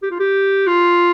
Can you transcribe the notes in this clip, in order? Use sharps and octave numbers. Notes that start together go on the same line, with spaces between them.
G4
F4
G4
F4